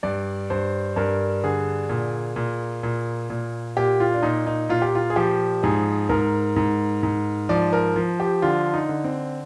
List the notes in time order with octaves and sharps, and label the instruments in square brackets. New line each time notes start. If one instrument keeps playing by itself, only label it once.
[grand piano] G2 D5
G2 C5
G2 A#4
D3 G#4
A#2
A#2
A#2
A#2
A#2 G4
F4
D4
A#2 D#4
D#4
A#2 F4
G4
F4
G#4
F3 G4
G#2 G#4
G#2 A#4
G#2
G#2
F3 D5
A#4
F3
G4
D3 F4
D#4
D3
C4